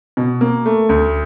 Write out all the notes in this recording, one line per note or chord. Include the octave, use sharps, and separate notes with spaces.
B2
A#3
A3
D2